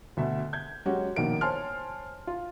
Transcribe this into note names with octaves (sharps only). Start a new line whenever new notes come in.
D2 B2 E5
G6 G#6
F#3 G#3 C#4 F#4 G4
A#1 B2 D#3 A#3 D7
C5 C#5 G#5 A5 C6 F6
F4